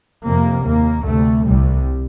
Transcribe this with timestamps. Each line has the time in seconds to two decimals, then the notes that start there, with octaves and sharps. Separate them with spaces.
0.24 F2 C3 A#3
0.64 D#2 A#3
1.05 D2 C3 A3
1.45 C2 C3 G3